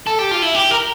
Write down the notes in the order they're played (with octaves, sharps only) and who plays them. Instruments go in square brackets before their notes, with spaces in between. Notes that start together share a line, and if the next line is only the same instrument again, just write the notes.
[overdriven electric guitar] A4
G4
F4
E4
G4
A#4